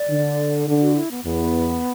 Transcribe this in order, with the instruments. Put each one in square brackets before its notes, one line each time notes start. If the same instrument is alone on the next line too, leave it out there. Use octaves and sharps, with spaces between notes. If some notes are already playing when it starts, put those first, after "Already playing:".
Already playing: [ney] D5
[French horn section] D3
D3
[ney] F#4
E4
B3
[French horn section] E2 [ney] B3